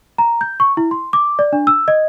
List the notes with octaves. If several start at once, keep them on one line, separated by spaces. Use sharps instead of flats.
A#5
G6
C#6
E4
C6
D6
D5
D4
E6
D#5